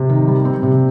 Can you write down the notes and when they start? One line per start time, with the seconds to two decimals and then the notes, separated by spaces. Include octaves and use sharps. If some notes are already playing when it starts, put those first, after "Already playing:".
Already playing: C3
0.09 D#3
0.28 G3
0.45 C4
0.63 C3